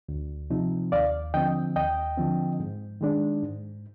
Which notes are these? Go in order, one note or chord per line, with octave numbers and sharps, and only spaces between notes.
D2
C3 F3 C4 D#4
D#2 D5 F5
D3 F3 C4 D#5 G5
D#2 D#5 G5
D3 F3 C4
G#2
D#3 G#3 D4
G#2